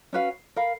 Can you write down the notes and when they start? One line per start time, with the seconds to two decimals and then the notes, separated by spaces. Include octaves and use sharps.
0.13 C#4 F#4 B4 F5
0.56 A#4 F5 B5